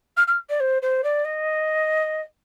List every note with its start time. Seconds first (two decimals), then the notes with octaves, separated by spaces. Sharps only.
0.17 F6
0.27 F6
0.49 D5
0.60 C5
0.82 C5
1.04 D5
1.25 D#5